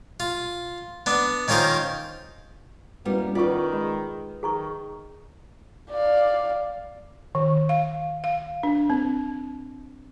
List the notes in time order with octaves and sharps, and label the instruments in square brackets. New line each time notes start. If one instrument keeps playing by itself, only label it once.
[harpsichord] F4
B3 D4
D#3 C#4 F4 A#4 C5
[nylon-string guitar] G3 B3 [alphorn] A#3 [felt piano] C#4 E4 F#4
[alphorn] D#3 [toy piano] F4 F#5 C#6 [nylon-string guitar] B4 D5
[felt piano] G#3 [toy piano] B5
[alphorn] D#3 [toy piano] G#4 A#5 C#6
[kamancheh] D5 F5
[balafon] D#3
F5
F5
D4
C4